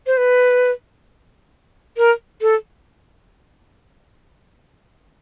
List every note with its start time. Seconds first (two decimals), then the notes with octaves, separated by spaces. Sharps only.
0.07 C5
0.17 B4
1.97 A#4
2.42 A4